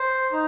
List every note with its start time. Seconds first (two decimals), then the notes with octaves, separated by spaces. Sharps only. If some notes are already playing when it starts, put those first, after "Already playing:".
Already playing: C5
0.32 D#4